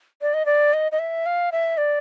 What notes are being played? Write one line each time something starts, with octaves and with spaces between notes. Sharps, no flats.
D5
D#5
D5
D#5
D#5
E5
F5
E5
D5